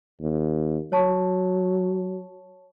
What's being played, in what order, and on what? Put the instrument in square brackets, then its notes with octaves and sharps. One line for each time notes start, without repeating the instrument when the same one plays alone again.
[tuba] D#2
[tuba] F#3 [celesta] C#5 A5 C#6